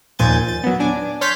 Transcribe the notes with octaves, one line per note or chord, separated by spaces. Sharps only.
D#2 A#2 F3 G#5 G6 A6
A6
F#3 B3
D4 G#5 D6
C#5 C6 F6 G6 A6 B6